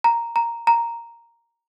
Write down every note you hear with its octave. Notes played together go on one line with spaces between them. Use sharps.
A#5
A#5
A#5